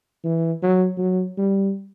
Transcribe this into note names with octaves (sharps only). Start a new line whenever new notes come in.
E3
F#3
F#3
G3